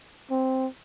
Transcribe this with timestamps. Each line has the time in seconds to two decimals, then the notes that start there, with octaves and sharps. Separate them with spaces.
0.31 C4